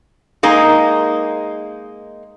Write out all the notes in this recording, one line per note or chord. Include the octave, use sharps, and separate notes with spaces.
G#3 A#3 D#4